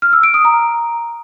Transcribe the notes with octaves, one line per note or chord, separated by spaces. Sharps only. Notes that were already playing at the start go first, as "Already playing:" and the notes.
F6
E6
D7
D#6
A#5